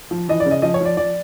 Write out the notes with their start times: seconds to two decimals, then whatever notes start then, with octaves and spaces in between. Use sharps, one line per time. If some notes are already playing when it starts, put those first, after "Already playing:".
0.11 F3
0.28 E3 D#5
0.40 D5
0.46 C#3
0.51 D#5
0.62 F3 D#5
0.74 C#5
0.80 F3 D5
0.97 F3 D5